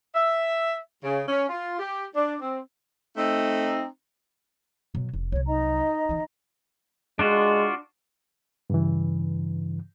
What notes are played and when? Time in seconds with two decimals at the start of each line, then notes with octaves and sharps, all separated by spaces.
0.14 E5
1.03 C#3
1.28 C#4
1.49 F4
1.78 G4
2.14 D4
2.40 C4
3.17 A3 C4 D#4
4.95 B2 F#3
5.14 F1
5.32 C2 F#3 C#5
5.46 D#4 D#5 A#5
6.09 D#3 E3
7.19 G#3 D4 F4 F#4
8.70 G2 C#3 E3